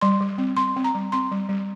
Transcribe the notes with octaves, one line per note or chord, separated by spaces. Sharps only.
G3 C6
G3
C4
C4 C6
C4
A#5
G3
C4 C6
G3
G3